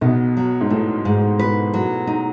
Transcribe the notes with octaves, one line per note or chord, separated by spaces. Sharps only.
B1 B2 B3
F#3
G#2
A2 A3
G#2
B4
F#3
D#4